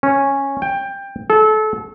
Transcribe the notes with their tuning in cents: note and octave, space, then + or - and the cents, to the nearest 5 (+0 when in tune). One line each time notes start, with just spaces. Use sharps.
C#4 -10
G5 +15
A4 -30